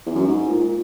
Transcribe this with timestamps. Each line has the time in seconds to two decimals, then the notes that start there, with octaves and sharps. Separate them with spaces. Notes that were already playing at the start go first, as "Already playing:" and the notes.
0.06 E2
0.15 F#2
0.25 G#2
0.48 A#2
0.61 A#2